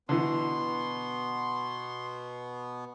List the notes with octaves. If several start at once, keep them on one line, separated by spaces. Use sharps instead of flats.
B2 D3 E3 B3 C6